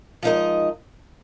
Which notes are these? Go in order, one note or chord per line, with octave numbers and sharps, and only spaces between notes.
F3 G#3 D#4 A#4 D#5